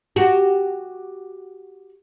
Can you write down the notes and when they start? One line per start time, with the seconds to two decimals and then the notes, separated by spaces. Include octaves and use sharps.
0.16 F#4 G4